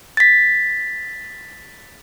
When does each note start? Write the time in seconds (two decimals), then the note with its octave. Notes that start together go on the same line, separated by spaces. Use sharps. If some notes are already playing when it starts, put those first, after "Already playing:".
0.17 A6 B6